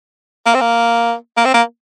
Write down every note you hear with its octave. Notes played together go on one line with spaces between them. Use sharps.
A#3
C4
A#3
A#3
C4
A#3